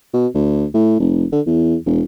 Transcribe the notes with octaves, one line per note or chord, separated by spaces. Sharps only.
B2
D2
A2
F1
D3
E2
E1